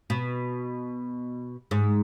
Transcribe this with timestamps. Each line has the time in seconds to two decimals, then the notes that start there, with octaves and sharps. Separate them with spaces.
0.10 B2
1.71 G#2